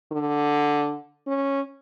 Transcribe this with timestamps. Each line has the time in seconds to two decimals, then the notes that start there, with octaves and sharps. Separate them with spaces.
0.12 D3
1.27 C#4